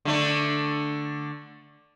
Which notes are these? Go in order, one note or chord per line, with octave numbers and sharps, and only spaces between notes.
D3 A3 D4